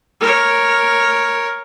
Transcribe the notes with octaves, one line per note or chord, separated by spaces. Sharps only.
A#4 C#5